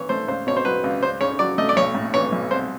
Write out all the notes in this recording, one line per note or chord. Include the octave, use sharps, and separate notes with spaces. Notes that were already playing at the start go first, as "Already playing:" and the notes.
Already playing: E3 C#5
A3 C5
C#2 C5
B2 C#5
C5
F#3 B4
C#2
C#2 C5
C#3 C#5
F#3 D5
A3 D#5
D5
B1 C#5
A2
E3 C#5
B1
C2 C5